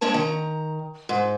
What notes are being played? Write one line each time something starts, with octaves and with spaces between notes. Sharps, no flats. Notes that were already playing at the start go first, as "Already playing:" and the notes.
G#3 A#3 D4 C#5 A5
D#3 A#5
G#2